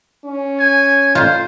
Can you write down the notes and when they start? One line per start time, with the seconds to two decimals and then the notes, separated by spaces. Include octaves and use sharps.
0.25 C#4
0.59 G#5
1.15 F4 C5